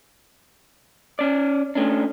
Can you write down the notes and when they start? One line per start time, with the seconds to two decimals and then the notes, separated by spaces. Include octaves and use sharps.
1.19 C#4 D5
1.75 A3 C#4 D4